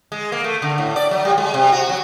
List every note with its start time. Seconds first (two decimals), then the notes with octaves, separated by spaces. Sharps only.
0.12 G#3
0.32 A#3
0.44 A3
0.62 D3
0.78 A2
0.96 D5
1.11 F#3
1.25 G3
1.38 G#3
1.54 C3
1.72 F#4
1.89 F#3